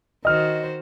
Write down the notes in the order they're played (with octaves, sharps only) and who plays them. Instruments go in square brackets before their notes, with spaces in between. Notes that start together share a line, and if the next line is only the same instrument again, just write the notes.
[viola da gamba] D#3 F#4 C5 [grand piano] D#5 F6